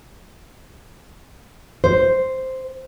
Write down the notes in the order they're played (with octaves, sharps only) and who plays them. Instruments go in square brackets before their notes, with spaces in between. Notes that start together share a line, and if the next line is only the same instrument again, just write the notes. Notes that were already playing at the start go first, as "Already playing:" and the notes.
[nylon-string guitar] C5